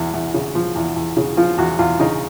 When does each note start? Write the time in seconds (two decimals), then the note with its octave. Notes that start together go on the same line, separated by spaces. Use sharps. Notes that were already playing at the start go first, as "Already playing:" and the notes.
Already playing: E2 E4
0.14 E2
0.34 C#3
0.55 F3
0.76 E2
0.96 E2
1.17 C#3
1.37 F3 F4
1.58 E2 F#4
1.79 E2 F4
2.00 C#3 D#4